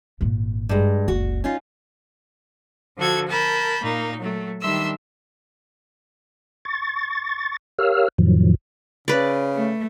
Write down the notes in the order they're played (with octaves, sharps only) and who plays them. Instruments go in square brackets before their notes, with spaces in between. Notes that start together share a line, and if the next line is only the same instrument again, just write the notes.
[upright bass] G#1 A#2
[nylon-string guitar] G2 G#3
[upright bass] F#1 C#2 [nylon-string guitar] F#4
[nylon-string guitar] C#4 D#4 F4
[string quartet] D3 F3 F#4 A4 G#6
A#4 A5 B5 G6
A#2 A#3 D#4
F#3 A3
D#3 G3 D4 E5 C6 E6
[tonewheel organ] C#6 A6
G4 A#4 C#5 F5 E6 F6
F2 A2 D#3 F3 F#3
[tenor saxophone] C#3 [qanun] B4 D5
[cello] A3